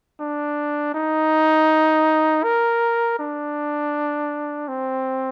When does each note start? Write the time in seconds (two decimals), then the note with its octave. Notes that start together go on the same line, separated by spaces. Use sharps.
0.20 D4
0.94 D#4
2.44 A#4
3.19 D4
4.68 C4